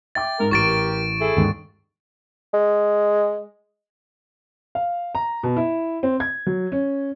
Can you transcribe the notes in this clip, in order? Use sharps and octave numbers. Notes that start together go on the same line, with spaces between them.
E5 G5 D6 A6
G#2 A#4
A1 G4 A#4 C#6 A6 D7
E4 G#4 A4
D#2 G#2 D3
G#3
F5
A#5
B2
E4
C4
G#6
F#3
C#4